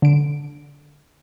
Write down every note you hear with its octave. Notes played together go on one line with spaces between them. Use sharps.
D3 D7